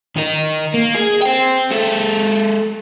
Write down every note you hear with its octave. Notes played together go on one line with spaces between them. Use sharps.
D#3 D#4
A#3
G#4
C5 G5
G#3 A4